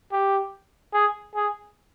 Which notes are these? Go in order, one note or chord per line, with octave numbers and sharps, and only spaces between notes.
G4
G#4
G#4